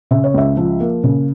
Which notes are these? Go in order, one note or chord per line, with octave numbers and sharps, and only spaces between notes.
C#3 E5
C#5
C#2 E5
F3
A#3
C#3